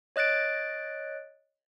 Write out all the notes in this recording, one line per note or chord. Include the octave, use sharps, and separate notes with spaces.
C#5 D#5 F#6 A6 D7